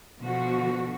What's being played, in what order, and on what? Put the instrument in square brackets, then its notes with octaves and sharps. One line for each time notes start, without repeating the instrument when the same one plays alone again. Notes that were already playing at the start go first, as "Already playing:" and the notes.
[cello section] B2 D3 F3 F#4